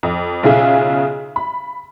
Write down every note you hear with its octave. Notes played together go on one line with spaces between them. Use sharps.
F2
B1 C#3 F4 G#4 E5
B5